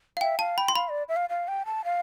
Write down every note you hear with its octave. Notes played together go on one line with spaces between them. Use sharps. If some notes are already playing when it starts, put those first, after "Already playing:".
F5
E5 G5
F5 A5
G5 B5
C6
F5 B5
D5
E5
F5
F5
G5
A5
F5